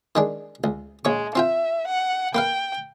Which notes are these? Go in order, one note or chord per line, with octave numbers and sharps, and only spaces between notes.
D#3 G#3 D4
C#2
A#1 G#3 C#5 C#6
C4 F4 E5 G5
F#5
A#3 B4 F5 G5